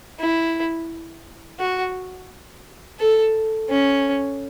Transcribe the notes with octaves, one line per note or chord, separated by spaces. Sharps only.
E4
F#4
A4
C#4